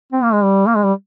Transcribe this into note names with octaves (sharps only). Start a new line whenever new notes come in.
C4
A#3
G#3
G3
A#3
G#3
G3